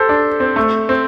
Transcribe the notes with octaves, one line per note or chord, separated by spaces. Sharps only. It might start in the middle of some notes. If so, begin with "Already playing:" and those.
Already playing: G4 A4 C5
D4
C4
A3
C4